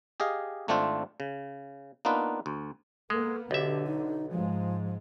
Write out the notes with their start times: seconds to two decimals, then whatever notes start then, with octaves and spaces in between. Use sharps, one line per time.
0.20 G4 G#4 D#5 F5
0.68 G#1 A3 C4 D4 F4 C5
1.20 C#3
2.05 A#3 B3 D4 D#4 F4 B4
2.46 D2
3.10 G#3 A#3 B3 A4
3.51 B1 D3 G4 E5
3.86 D#4
4.31 G#2 F3 G#3